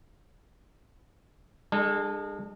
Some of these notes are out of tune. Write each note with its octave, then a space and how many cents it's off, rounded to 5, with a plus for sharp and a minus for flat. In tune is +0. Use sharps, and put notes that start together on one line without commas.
G#3 -35 D4 +40 A4 +0